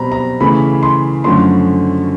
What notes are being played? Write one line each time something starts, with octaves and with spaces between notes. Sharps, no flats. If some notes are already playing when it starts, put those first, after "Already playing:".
Already playing: B2 G3 C4 A#5 B5
A#5
C#3 E3 A3 B5
C6
F#2 D3 F3 A3 C#4 C6